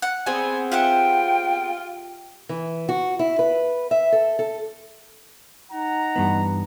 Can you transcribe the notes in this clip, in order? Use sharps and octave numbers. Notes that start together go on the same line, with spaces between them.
F#5
B3 C4 G#4 G#5
F4 G4 E5 F#5 G5
E3
F#4
E4
B4
E5
A4
A4
D#4 F#5 A#5
G2 E3 B3